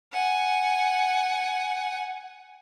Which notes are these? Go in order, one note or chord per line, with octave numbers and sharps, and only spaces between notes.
F#5 G#5